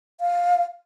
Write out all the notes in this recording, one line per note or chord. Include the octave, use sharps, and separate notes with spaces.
F5